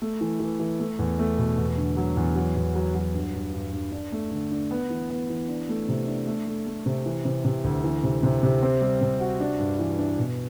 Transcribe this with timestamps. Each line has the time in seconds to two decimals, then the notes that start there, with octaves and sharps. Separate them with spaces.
0.02 A3
0.21 E3
0.40 E3
0.60 E3
0.80 A3
0.99 E2
1.19 A3
1.38 B2
1.57 E2
1.77 D3
1.97 F#3
2.17 E2
2.36 F#3
2.56 E2
2.75 F#3
2.95 F#3
3.14 G2
3.34 G2
3.54 G2
3.73 G2
3.92 D4
4.12 A3
4.31 D3
4.51 D4
4.71 B3
4.90 E3
5.10 B3
5.30 E3
5.48 D4
5.69 A3
5.89 C3
6.07 D4
6.27 A3
6.47 A3
6.67 A3
6.86 C3
7.06 E3
7.25 C3
7.45 C3
7.64 D2
7.84 E3
8.03 C3
8.23 C3
8.43 C3
8.63 C4
8.81 G3
9.01 C3
9.20 F#4
9.40 D4
9.60 G2
9.79 E3
9.99 D4
10.18 B2